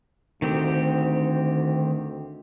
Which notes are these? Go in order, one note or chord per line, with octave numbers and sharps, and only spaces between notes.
D2 D#3 C4 G4